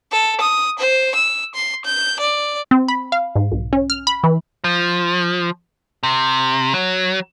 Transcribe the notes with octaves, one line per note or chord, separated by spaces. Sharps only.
A4
D#6
C5
E6
C6
G6
D5
C4
B5
F5
G#2
B1
C#4
F6
B5
E3
F3
C3
F#3